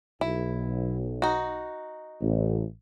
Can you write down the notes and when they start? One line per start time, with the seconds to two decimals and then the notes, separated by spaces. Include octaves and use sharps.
0.21 B1 E4
1.22 D#4 F#4
2.21 A1